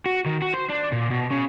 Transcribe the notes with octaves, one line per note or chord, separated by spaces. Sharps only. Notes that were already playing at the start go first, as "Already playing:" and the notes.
F#4
D#3
F#4
C5
D4
A#2
B2
C#3